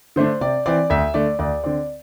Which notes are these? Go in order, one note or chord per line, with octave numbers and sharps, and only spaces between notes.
D3 A3 D4 C5
C3 D5
E3 C4 D5
D2 E5
D3 A3 D5
D2 D5
D3 C4 D5